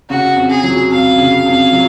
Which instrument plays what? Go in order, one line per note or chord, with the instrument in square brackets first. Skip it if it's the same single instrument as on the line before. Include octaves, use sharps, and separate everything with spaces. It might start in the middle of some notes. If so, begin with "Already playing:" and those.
[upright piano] C#3 [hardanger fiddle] F#4
[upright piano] F2
[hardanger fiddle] G#4
[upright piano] F#3
[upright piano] F2 [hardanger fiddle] F5
[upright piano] C#3
F2
F#3